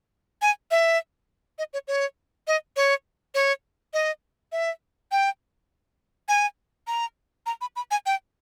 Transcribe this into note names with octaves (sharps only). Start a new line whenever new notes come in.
G#5
E5
D#5
C#5
C#5
D#5
C#5
C#5
D#5
E5
G5
G#5
A#5
A#5
B5
B5
G#5
G5